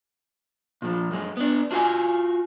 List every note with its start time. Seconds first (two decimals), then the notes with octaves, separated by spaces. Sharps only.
0.82 A#2 F3
1.11 F#2 G#3
1.37 B3 D4
1.71 D4 F4 F#4 F5 G#5